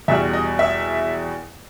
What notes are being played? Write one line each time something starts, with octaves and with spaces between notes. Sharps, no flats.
E2 B2 G3 E5
D#5
E5